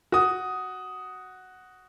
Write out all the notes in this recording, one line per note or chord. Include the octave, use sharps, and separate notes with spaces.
F#4 D#6